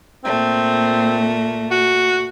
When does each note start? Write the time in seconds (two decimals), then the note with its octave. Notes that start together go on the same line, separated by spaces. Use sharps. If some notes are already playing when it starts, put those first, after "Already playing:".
0.24 A#2 A3 C4
1.71 F#4